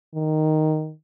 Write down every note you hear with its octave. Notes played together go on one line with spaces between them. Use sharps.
D#3